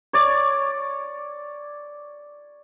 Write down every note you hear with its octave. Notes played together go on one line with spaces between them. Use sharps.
C#5 D5